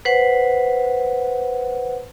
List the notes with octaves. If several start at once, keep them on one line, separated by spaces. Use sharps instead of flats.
B4 C5 F#5